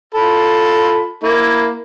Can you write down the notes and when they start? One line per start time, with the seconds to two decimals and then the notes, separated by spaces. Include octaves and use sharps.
0.15 F4 A4 B5
1.23 A#3 E4